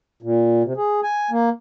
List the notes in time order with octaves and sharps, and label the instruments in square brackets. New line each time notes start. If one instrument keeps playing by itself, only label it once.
[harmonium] A#2
C3
G#4
G#5
A#3